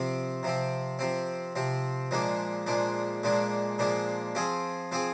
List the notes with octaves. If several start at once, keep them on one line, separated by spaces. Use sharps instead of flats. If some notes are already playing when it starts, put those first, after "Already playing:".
Already playing: C3 F3 C4
C3 F3 C4
C3 F3 C4
C3 F3 C4
A#2 F3 G#3 D4
A#2 F3 G#3 D4
A#2 F3 G#3 D4
A#2 F3 G#3 D4
F3 C4 F4 G#4
F3 C4 F4 G#4